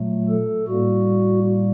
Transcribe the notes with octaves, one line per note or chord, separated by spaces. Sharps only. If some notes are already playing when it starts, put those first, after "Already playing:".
Already playing: A#2 F#3 A3
A4
A2 G3 A#3 F#4